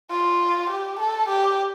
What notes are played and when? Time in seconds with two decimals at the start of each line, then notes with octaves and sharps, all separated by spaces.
0.10 F4
0.70 G4
0.99 A4
1.28 G4